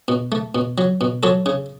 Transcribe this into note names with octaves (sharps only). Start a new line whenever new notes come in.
B2
A3
B2
F#3
B2
F#3 A4 C#5
C#3